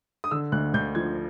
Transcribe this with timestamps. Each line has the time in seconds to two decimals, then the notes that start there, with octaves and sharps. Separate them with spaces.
0.24 D#6
0.31 D3 E6
0.52 D2 F#6
0.74 D2 G6
0.95 F3 G#6